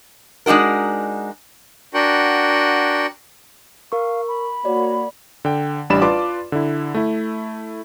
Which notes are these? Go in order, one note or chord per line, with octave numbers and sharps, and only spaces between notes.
G#3 D4 D#4 F#4 A#4
D4 F#4 A#4 F#5 G5
A#4 F5 C#6
B5
A#3 F#4 C#5 D5
D3 G5
A1 G3 D4 D5 B5 E7
F4 B4 D5 A5 C6 D6
D3 E4
A3 E4